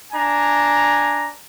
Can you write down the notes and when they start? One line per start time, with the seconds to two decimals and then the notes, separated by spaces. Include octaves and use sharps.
0.13 D4 G#5 A#5